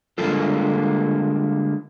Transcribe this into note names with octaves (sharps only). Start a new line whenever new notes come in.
D3 G3 G#3 A#3 F4 A4